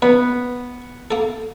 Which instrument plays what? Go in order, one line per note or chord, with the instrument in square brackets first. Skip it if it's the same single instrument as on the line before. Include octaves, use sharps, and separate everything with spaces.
[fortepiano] B3 [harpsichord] B4
[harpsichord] A#3 A4